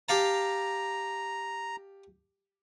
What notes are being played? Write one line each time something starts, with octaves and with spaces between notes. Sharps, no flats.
G4 F5 A5 A#5